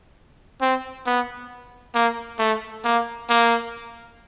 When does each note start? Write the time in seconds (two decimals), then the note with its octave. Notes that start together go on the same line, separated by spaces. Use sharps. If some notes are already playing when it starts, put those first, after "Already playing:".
0.61 C4
1.06 B3
1.95 A#3
2.39 A3
2.85 A#3
3.29 A#3